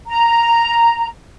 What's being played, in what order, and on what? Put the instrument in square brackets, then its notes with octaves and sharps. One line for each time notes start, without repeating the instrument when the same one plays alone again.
[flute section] A#5